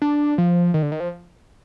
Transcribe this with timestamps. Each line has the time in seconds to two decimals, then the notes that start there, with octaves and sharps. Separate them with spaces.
0.02 D4
0.38 F3
0.74 D#3
0.83 D3
0.92 D#3
1.00 F3